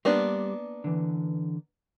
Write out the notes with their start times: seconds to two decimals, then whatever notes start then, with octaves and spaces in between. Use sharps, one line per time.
0.05 G3 A#3 B3 D4 G4 C6
0.84 D3 E3